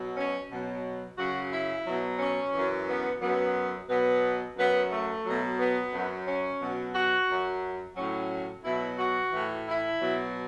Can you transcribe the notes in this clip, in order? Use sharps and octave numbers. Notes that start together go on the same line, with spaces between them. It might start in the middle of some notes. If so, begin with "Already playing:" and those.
Already playing: B2 F#3
C#4
B2 F#3
F#2 C#3 F#3 F#4
E4
B2 F#3
C#4
F#2 E3
B3
F#2 F#3 B3
B2 F#3 B3
F#2 F#3 B3
A3
B2 F#3
B3
F#2 F#3
C#4
B2 F#3
F#4
F#2 F#3
A2 F#3 C#4
B2 F#3 E4
F#4
A2 E3
E4
B2 F#3